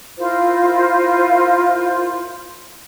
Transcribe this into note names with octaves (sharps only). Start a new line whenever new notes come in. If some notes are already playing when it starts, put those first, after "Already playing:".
E4 F4 A#4 C5